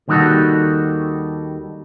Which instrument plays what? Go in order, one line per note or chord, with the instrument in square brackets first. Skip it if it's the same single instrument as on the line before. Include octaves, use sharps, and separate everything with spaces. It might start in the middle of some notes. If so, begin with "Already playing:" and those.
[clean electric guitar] D#2 D#3 G3 D#4 F#4 A4